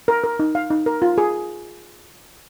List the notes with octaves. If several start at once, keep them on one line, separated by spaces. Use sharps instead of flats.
A#4
A#4
D#4
F5
D#4
A#4
F4
G#4